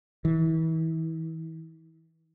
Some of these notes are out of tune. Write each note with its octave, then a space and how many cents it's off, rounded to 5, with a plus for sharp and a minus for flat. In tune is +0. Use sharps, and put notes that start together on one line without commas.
E3 -35